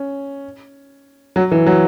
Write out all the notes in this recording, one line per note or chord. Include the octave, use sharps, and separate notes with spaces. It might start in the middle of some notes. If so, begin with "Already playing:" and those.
Already playing: C#4
F#3
E3
F#3